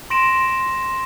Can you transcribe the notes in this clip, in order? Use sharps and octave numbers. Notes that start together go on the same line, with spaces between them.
C6 A#6 D7 E7